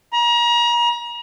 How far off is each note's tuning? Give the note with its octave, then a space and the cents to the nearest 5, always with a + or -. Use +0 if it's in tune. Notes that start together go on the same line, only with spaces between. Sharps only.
A#5 +35